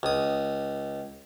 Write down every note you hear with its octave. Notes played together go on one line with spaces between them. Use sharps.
C#2 D#6